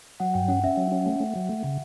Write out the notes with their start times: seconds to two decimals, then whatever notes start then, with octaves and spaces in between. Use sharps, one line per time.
0.20 F#3 F#5
0.34 G2 G5
0.48 C#4 F#5
0.63 C#4 E5
0.77 F#3
0.92 C#4
1.06 A3
1.20 A3
1.36 F#3
1.49 A3
1.64 C#3